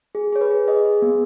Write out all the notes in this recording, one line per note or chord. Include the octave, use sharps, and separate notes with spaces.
G#4
G#4 C#5
B4
G#4
G#4 D#5
G#4
B3